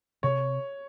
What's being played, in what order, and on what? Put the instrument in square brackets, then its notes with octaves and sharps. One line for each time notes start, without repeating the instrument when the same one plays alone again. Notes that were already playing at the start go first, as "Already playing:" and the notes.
[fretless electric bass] C3 [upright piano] C#5